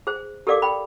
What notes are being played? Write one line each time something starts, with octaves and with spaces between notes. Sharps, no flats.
G#4 C5
G4 A4 A#4 D5 F5 D6
G5 B5